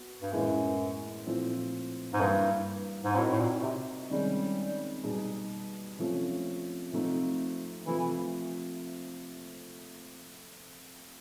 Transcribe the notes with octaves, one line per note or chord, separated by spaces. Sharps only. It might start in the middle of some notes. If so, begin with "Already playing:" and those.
Already playing: B3 F#4
G2
F#2 A2 E3 G#3 B3
A#2 F3 A3 C4 E4
G#2
G2 E3 G3 A#3
G#2
A2 C4 D#4 F#4 A#4 D#5
A2
A#2
C3
C3 D#3 G3 G#3 C#4
B2 G3 B3 D#4 G#4
C3 F3 A3 C#4
C3 F3 A3 C4 D#4
C3 E3 F3 A3